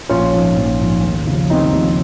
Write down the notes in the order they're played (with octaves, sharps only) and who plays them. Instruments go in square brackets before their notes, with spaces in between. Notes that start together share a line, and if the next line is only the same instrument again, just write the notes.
[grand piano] A#1 C#4 F4
G#2 F3
A#1
G#2 F3
D#2
C#3 F3
D#2 C4 D#4
C#3 F3